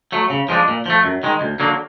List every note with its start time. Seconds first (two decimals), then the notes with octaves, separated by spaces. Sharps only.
0.12 F#3 A3
0.30 C#3
0.49 F3 G#3 B3 D4
0.68 A#2
0.86 F3 A3
1.04 F#2
1.23 D#3 G#3
1.41 D2
1.60 D3 F#3 A#3